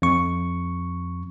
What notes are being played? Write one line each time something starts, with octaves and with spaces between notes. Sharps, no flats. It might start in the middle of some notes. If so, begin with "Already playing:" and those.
F2 C#6